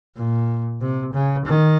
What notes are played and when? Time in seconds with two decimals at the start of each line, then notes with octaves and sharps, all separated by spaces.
0.16 A#2
0.81 C3
1.14 C#3
1.46 D#3